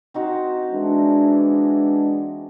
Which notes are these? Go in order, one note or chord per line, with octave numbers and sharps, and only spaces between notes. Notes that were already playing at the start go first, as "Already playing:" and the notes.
C4 D#4 F#4
E3 G#3 D4